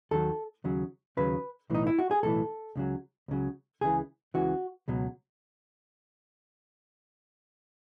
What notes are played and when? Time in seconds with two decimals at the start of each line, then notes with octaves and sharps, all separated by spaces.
0.11 D#2 D#3 F#3 A4
0.64 D#2 C#3 F#3
1.17 D#2 C#3 F#3 B4
1.70 B1 A2 E3 D#4
1.87 E4
1.99 F#4
2.11 G#4
2.23 B1 A2 E3 A4
2.76 C#2 C#3 F#3
3.28 C#2 C#3 F#3
3.81 C#2 C#3 E3 G#4
4.34 C#2 C#3 E3 F#4
4.88 C#2 B2 F#3